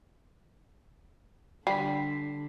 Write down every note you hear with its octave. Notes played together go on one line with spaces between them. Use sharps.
D3 G3 B6 C7